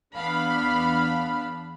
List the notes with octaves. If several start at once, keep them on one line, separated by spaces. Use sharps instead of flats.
E2 B3 D4 F5 B5